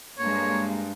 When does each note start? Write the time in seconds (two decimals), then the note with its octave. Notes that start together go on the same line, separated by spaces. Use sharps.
0.19 G2 G#3 A#3 C#5